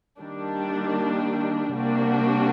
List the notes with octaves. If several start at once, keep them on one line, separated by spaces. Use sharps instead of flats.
D#3 G3 A#3 D4
C3 G3 A#3 D4 F#4